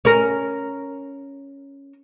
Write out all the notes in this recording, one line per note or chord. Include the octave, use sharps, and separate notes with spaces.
C#4 A#4